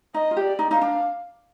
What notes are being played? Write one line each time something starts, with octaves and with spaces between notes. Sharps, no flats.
D#4 D#5
F4
G4
D5
D#4
D#4 F5
D4